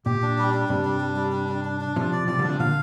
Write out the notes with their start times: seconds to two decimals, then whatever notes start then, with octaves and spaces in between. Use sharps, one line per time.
0.06 A#2 G4
0.22 D4
0.38 G3
0.54 D4
0.69 G2 C3 G3
0.85 D4
1.01 G3
1.17 G3
1.32 D4
1.49 D4
1.65 D4
1.81 D4
1.96 C3 F3 D4
2.13 D5
2.28 C3 F3 D5
2.39 D3 G3 D4
2.49 C3 F3
2.60 A#2 D3 F5